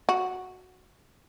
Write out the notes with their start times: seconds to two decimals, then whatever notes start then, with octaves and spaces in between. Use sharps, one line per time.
0.09 F#4